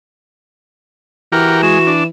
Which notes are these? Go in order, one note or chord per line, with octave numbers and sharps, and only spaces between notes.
E3 F#4 G4 A#4 F6
G#3 F#4 E7
D4